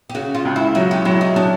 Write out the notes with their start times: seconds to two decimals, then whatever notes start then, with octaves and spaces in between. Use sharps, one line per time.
0.09 G4
0.15 C#3 F#4
0.35 F4
0.45 C#2
0.56 E4
0.75 F#3 F#4
0.91 G4
1.05 F#3 E4
1.21 D#4
1.36 F#3 D4